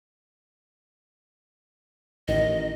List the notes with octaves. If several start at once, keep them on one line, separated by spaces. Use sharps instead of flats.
A1 D#3 D#5